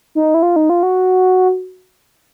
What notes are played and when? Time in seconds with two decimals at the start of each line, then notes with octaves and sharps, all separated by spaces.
0.15 D#4
0.34 E4
0.42 F4
0.56 D#4
0.70 F4
0.83 F#4